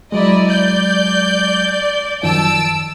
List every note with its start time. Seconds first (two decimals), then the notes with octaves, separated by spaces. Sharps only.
0.12 F#3 G#3 E4 D5 D#5
0.46 D5 G6
2.23 F#2 D#3 F3 A5 E6 D7